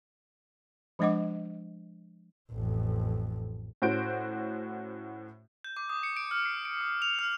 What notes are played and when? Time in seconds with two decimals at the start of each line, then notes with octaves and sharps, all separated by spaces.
0.99 F3 G#3 D4 D#5 F#5 D6
2.52 A1 F2
3.82 A2 C#4 F#4 C5 G6 D7
5.64 G6
5.77 D6
5.89 D#6
6.03 C#7
6.17 D7
6.31 F6
6.45 C7
6.65 D7
6.81 D#6
7.02 F7
7.19 F6